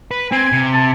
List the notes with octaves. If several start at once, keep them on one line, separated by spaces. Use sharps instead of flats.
B4
C4 G#5
C3
A5